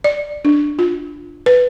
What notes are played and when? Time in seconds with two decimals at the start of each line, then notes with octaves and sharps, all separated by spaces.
0.04 D5
0.45 D4
0.79 F4
1.46 B4